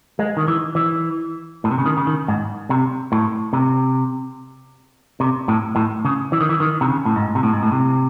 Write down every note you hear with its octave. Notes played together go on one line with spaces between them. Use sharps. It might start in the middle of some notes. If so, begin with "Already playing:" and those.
G#3
D#3
E3
E3
A2
C3
C#3
D#3
C#3
D#3
G#2
C3
A2
C3
C3
A2
A2
C#3
E3
D#3
E3
D#3
C3
C#3
A2
G#2
C3
A2
G#2
A2
C3